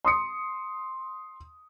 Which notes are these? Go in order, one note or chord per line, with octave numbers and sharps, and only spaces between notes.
C6 D#6 C#7